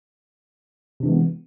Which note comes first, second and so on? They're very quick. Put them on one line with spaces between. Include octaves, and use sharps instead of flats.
C3 D4 E3 G#3 B3